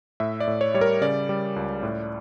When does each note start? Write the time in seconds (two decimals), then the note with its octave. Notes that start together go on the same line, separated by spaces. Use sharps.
0.20 A2 E5
0.40 D5
0.47 A2
0.61 C#5
0.74 G3 C#5
0.81 A#4
1.01 C#3 D5
1.29 G3
1.56 C#2
1.83 A2